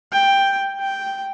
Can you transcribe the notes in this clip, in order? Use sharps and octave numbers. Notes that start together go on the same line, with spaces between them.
G5
G5